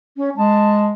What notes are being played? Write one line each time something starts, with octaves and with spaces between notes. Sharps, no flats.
C#4
G#3 A5